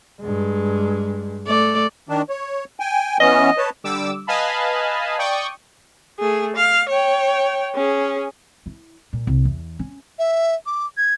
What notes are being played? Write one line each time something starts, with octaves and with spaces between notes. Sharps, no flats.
G2 G#3
A3 D5
D#3 D4
C#5
G5 G#5
E3 B3 C#4 D#5
B4 C#5 A5
D3 G3 D6 E6
B4 D#5 F5 G#5 A5 B5
D5 G5 C#6 D#6
A3 G#4
F5
C#5 G5
C#4 G#4
E4
A#2
C2
E2
C#4
E5
D6
G#6